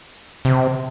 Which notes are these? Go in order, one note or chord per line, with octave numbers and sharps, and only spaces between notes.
C3